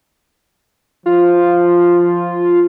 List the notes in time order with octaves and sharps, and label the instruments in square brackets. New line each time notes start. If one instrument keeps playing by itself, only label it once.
[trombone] F3 [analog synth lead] F4